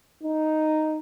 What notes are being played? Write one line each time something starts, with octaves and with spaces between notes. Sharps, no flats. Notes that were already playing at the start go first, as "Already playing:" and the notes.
D#4